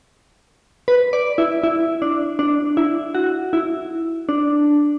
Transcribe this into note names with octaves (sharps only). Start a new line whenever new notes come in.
B4
D5
E4
E4
D4
D4
E4
F#4
E4
D4